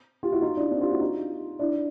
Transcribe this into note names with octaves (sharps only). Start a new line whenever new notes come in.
F4 G4
E4 F#4
D#4 F4
D4 E4
C4 D4
F4 G4
E4 F#4
D#4 F4
D4 E4